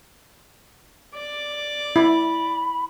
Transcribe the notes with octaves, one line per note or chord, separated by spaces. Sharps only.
D5
E4 B5